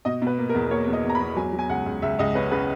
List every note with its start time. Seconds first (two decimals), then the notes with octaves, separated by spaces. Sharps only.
0.05 B2 D#5
0.22 B2
0.27 B4
0.38 A#3
0.49 A#4
0.54 E2
0.71 A#3 C#5
0.87 E2
0.93 D#5
1.04 E2
1.10 A#5
1.15 B5
1.20 E2
1.36 F#3 G#5
1.53 F#3
1.59 G#5
1.69 C#2 F#5
1.86 C#2
2.02 C#2 E5
2.19 C#2 D#5
2.35 C#4 B4
2.51 C#3 B4